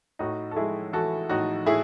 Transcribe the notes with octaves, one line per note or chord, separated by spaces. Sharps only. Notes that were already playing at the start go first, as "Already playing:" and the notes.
A2 D#4 F#4
A4
G#3 E4 G#4
E3 F#4 A4
A2 D#4 F#4
A2 E4 G#4